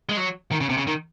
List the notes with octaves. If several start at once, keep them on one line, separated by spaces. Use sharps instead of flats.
G#3
F#3
D#3
C#3
C3
C#3
D#3